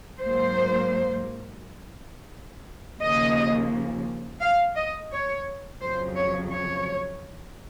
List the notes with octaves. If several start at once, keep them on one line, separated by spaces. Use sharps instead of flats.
G#2 F#3 A#3 C5
D#2 C#3 F3 A#3 D#5
F5
D#5
C#5
F2 C#3 F#3 C5
C#5
C#5